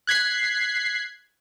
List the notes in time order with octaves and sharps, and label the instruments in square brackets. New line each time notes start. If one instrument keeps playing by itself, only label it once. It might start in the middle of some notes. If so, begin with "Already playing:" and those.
[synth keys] F#6 G#6 B6 C7